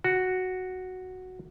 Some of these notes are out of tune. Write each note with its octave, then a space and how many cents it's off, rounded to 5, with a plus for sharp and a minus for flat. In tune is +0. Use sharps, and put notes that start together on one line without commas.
F#4 +0